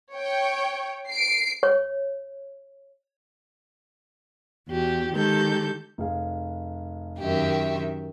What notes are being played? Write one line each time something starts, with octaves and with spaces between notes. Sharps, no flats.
C#5 G5
C7 D7
C#5
E2 F#4 G4
D#3 G#3 G4 A4 G6
F1 G#4 F5
F#2 D#3 G4 E5